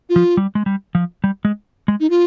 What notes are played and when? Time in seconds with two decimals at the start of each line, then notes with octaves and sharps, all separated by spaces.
0.09 F4
0.16 F3
0.37 G3
0.55 G#3
0.66 G3
0.95 F3
1.24 G3
1.45 G#3
1.88 G#3
2.00 D#4
2.10 F4